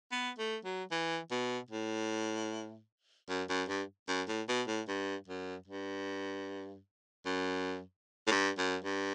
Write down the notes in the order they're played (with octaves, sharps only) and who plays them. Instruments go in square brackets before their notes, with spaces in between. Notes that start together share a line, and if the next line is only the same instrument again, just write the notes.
[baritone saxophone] B3
A3
F#3
E3
B2
A2
F#2
F#2
G2
F#2
A2
B2
A2
G2
F#2
G2
F#2
A2
G2
F#2
G2